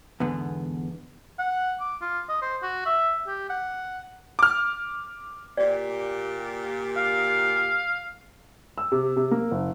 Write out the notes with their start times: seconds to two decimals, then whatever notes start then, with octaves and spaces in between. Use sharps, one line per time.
0.20 E2 G#2 D3 B3
1.39 F#5
1.80 D6
2.01 F4
2.29 D#5
2.42 C5
2.62 F#4
2.86 E5
3.27 G4
3.50 F#5
4.39 D6 F6
5.57 A#2 G4 D5
6.97 F5
8.78 E6
8.92 C3
9.16 C3
9.31 A#3
9.51 F#1